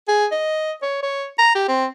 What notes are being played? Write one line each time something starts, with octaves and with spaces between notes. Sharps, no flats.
G#4
D#5
C#5
C#5
A#5
G4
C4